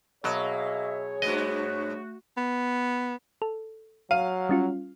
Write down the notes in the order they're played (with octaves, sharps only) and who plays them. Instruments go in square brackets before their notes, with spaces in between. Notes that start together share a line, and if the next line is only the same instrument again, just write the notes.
[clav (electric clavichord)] B2 F#3 [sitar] A#3 [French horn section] G#4 C#5 [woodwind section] D#5 E5
[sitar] G2 B3 [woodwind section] A3 F#4 [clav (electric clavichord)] D#5
[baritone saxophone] B3
[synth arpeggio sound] A4
[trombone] F#3 [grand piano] F5 [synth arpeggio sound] D#7
[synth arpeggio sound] G3 C#4 F4